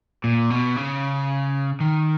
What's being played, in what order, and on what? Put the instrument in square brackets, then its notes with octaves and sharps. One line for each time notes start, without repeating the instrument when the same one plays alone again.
[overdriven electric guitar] A#2
B2
C#3
D#3